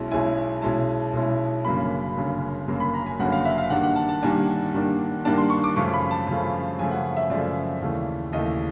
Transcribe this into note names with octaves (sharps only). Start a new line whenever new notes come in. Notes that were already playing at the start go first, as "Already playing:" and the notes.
Already playing: B1 B2 G#3 C#4 E4
B1 B2 G#3 C#4 E4 G#5
B1 B2 G#3 C#4 E4 A5
B1 B2 G#3 C#4 E4
G1 F#2 C#3 F#3 A#3 B5
G1 F#2 C#3 F#3 A#3
G1 F#2 C#3 F#3 A#3
B5
A#5
G#5
G1 F#2 C#3 F#3 A#3 F#5
F5
E5
F5
G2 D#3 G3 A#3 D4 F#5
F#5
A5
A5
G2 D#3 G3 A#3 D4 G#5
G2 D#3 G3 A#3 D4
G2 D#3 G3 A#3 D4 A5
C6
C#6
D6
F#2 C#3 F3 A3 C#6
B5
A5
F#2 C#3 F3 A3
F#2 C#3 F3 A3 G#5
F#5
E5
F#2 C#3 F3 A3 D5
D#2 C#3 E3 A3
D#2 C#3 E3 A3 D#5